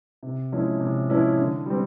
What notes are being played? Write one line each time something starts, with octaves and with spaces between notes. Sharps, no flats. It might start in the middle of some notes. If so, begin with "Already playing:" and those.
C3
F3 G#3 C#4 E4
C3
F3 G#3 C#4 E4
D3
G3 C4